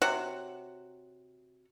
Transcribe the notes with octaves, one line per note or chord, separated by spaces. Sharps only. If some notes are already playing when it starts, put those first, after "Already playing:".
C3 F#4 C#5 F#5